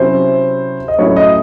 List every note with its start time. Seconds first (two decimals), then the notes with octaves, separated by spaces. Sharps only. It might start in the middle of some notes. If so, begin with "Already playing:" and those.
Already playing: C3 F#3 C#4 E4 C5
0.88 D#5
0.99 A2 F#3 A3 C#4 E4 C#5
1.16 D#5